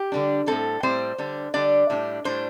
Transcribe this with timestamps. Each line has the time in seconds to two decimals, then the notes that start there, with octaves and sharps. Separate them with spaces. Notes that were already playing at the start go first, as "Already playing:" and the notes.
Already playing: G4
0.12 D3 G3 D4
0.47 A2 G3 C4 A4
0.83 A2 G3 C4 C5
1.18 D3 G3 D4
1.54 D3 G3 D4 D5
1.90 A2 G3 D4
2.25 A2 G3 D4 C5